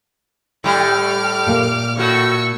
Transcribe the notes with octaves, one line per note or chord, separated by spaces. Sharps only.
A2 G3 D6 F6
A#2 A#3
A2 F#4 C#6 E6